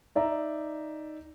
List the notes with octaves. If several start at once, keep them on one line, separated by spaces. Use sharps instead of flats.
D#4 D5 E5 A#5